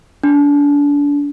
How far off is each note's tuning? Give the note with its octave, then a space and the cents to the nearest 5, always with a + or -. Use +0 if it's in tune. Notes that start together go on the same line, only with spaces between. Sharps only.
D4 -30